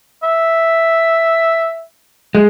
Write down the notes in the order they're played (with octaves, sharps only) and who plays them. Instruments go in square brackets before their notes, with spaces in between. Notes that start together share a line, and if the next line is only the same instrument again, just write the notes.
[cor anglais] E5
[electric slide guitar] G#3